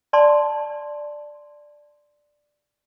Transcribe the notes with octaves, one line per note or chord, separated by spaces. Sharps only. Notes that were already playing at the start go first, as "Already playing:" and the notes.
D5 A5 C6